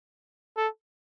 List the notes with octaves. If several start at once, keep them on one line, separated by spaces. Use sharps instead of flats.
A4